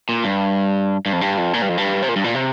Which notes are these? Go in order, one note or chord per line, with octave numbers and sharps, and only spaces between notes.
A#2
G2
G2
F2
G2
F2
A#2
G2
F2
G2
C3
A#2
G2
A#2
C3